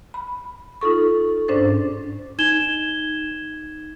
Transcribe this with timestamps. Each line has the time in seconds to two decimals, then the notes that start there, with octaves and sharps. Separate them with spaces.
0.14 B5
0.81 D#4 F4 A4 C#6
1.48 G#2 C#4 D4 C5 D5 A6
2.38 D#4 G#6 E7 G7